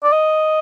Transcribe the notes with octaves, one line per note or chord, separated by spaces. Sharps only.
D5
D#5